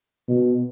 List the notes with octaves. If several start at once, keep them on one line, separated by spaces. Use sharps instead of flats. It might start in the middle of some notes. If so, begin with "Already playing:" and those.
B2